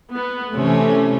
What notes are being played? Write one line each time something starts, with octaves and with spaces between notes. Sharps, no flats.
B3
C3 E3 A3 C#4